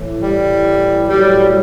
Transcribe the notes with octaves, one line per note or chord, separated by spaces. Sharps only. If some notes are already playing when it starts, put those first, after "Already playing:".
Already playing: A2 E3
G3
A2 F#3 G3